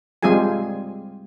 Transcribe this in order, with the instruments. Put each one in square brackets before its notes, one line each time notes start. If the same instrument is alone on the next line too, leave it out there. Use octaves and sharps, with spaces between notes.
[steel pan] G3 G#3 C4 F4 G#4 G#5